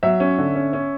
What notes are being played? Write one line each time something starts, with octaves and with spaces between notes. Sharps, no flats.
F#3 E5
C#4
D3
C#4
C#4